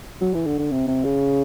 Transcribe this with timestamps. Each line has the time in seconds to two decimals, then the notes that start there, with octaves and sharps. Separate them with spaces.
0.21 F#3
0.34 E3
0.46 D3
0.59 D3
0.72 C3
0.87 C3
1.05 C#3